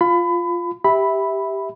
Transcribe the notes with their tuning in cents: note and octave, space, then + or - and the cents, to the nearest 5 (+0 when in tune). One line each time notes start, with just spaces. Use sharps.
F4 +0 B5 +25
G4 +0 E5 -15 B5 +0